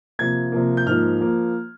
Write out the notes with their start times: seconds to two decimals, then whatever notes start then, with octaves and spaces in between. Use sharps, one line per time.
0.19 C3 F3 A#3 G#6
0.52 C3 F3 A#3
0.77 G6
0.87 G#2 F3 A#3 F6
1.20 F3 A#3